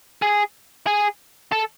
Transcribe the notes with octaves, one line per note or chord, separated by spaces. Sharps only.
G#4
G#4
A4